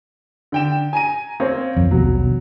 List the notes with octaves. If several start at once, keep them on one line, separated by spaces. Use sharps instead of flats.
D3 G5 E7
G#5 A#5 D#7
A#3 C4 C#5
F2
D#1 A#1 B2 F#3